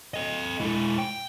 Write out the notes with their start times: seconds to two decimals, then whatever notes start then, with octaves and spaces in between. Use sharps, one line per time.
0.14 A4 D#5
0.60 G#3 E4
0.98 G5